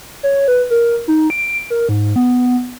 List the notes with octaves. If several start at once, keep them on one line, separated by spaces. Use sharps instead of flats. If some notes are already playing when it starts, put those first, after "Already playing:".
C#5
B4
A#4
D#4
D7
A#4
G#2
B3